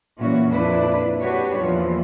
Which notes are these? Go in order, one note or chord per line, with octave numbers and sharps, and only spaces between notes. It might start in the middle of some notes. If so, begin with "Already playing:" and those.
A#2 E3 C#4 F#4
F2 A#2 D4 E4 B4
D4 F#4 G4 B4 C#5
E2 A#2 E3 F3